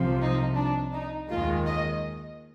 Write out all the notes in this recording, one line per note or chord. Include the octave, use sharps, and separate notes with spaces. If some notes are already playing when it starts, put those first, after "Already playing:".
Already playing: C2 C3 F3
D#4
D4
D#4
D#2 D#3 G#3 F4
D#5